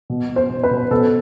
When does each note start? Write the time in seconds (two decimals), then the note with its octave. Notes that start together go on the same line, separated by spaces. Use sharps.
0.10 B2
0.29 B2
0.36 C5
0.50 B2
0.63 B4
0.71 B2
0.91 B2 A4